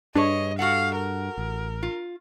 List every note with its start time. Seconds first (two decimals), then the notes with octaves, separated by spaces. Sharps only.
0.15 G2 D4 G#4 B4 C#5 D#5
0.59 F#4 A4 F5 F#5
0.96 A#4
1.38 A1
1.83 F4